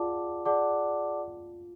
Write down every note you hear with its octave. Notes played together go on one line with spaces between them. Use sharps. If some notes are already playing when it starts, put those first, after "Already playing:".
Already playing: F4 G#4 D5 F#5 A5 D6
G#4 D5 F#5 A5 D6